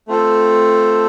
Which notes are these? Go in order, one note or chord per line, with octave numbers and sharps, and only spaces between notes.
A3 C4 F4 A4